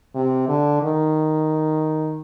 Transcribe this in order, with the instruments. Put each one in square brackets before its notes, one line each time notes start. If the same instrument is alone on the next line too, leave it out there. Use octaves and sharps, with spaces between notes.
[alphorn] C3
D3
D#3